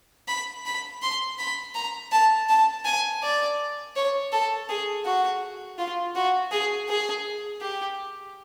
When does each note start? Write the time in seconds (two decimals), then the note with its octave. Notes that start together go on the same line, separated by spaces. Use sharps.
0.28 B5
0.66 B5
1.02 C6
1.38 B5
1.75 A#5
2.12 A5
2.49 A5
2.85 G#5
3.22 D5
3.96 C#5
4.32 A4
4.69 G#4
5.05 F#4
5.78 F4
6.15 F#4
6.51 G#4
6.89 G#4
7.61 G4